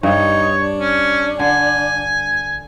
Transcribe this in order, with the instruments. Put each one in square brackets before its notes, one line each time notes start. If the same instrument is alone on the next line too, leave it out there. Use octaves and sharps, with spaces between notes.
[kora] G2 [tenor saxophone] D#4 [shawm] C#5
[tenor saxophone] D4
[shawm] C#4
[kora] D3 [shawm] G#5